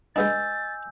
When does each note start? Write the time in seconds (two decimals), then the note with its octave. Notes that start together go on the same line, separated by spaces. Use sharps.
0.16 G#3 B3 D4 D#5 G#5 E6 G6 A6